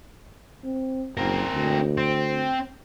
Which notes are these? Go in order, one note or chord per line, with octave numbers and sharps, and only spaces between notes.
C4
F#1 C4 A#4
D2
C4